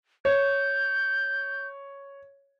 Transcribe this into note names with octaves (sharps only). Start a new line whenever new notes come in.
C#5 G6